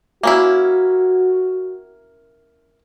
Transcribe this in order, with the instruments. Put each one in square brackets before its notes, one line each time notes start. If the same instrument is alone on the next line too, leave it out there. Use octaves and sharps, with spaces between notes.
[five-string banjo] A#3 C#4 E4 [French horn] F#4